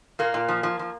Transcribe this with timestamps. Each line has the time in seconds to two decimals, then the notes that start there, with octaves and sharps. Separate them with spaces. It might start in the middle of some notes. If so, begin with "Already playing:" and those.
0.19 A#2 A#3
0.34 A#2
0.49 F3
0.63 F3
0.79 F3